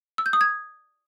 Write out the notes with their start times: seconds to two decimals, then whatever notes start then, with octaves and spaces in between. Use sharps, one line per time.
0.18 E6
0.26 G6
0.33 D#6
0.41 G#6